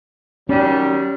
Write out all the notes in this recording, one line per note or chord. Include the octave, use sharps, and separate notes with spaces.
D#3 F#3 G3 C#4